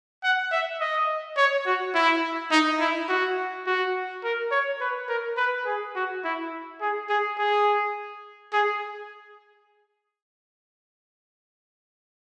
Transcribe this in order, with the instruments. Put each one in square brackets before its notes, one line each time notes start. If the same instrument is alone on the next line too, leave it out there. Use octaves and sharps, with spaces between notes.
[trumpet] F#5
E5
D#5
C#5
F#4
E4
D#4
E4
F#4
F#4
A#4
C#5
B4
A#4
B4
G#4
F#4
E4
G#4
G#4
G#4
G#4